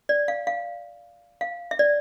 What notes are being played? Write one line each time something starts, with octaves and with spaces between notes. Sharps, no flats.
D5
F5
F5
F5
E5
D5